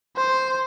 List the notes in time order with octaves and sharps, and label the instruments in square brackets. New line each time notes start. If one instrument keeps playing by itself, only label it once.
[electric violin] C5